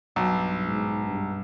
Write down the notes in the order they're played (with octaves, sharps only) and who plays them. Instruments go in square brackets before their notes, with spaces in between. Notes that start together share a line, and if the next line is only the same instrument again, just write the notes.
[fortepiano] B1 [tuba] G2
[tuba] G#2
G2